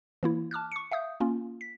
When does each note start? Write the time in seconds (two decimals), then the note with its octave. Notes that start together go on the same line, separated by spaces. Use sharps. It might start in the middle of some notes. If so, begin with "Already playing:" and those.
0.23 E3 A#3 E4
0.51 A5 D6 F6 F#6
0.72 C#6 C#7
0.91 E5 F5 D#6 G6
1.20 A#3 C#4 F4
1.61 B6